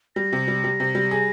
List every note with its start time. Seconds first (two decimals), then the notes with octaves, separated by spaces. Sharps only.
0.16 G3 A#6
0.33 C3
0.48 G3
0.64 G3
0.80 C3
0.95 G3
1.11 G#4